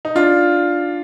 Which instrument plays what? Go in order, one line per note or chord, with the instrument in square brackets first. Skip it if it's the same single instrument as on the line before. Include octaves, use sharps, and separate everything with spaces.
[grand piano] D#4
D4 F4